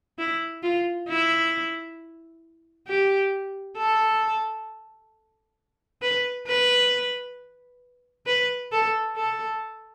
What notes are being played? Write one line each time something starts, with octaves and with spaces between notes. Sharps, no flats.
E4
F4
E4
G4
A4
B4
B4
B4
A4
A4